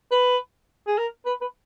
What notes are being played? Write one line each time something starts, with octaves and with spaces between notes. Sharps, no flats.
B4
G#4
A#4
B4
B4